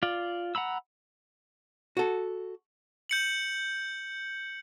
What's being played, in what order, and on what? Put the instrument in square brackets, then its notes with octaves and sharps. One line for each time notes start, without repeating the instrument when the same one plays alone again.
[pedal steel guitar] F4 D5
F#5 A#5 B5 E6
[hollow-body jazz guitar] F#4 A4
[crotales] G6 C#7 F#7